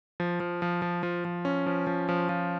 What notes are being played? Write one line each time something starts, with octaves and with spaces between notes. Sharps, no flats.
F3
F3
F3
F3
F3
F3
C#4
F3
F3
F3
F3